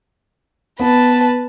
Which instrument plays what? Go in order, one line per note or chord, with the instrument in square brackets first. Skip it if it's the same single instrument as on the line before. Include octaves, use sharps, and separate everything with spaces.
[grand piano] B3 [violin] B4 A5